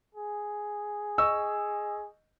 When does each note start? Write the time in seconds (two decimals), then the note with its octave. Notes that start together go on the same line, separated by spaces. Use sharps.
0.15 G#4
1.18 D#5 C#6 E6